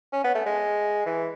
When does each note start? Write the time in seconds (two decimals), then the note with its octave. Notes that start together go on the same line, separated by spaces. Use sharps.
0.13 C#4
0.24 B3
0.35 A3
0.46 G#3
1.06 E3